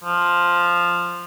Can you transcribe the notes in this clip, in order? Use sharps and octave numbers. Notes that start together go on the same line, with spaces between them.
F3